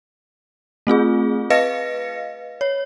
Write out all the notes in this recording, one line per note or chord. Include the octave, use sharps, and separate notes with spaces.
A3 C4 F4 G#4
B4 D#5 F5 A#6 C#7
C#5